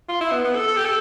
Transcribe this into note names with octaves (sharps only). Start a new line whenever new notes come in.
F4
E4
B3
B3
A4
A4
G4
A4